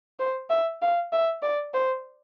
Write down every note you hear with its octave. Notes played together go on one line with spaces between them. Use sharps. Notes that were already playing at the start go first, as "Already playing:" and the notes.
C5
E5
F5
E5
D5
C5